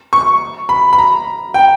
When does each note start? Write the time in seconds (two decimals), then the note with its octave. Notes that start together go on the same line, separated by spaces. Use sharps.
0.13 C#6
0.69 B5
0.93 B5
0.98 A#5
1.54 G5